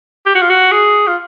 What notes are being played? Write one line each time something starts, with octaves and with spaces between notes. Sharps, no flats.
G4
F#4
F4
F#4
G#4
F4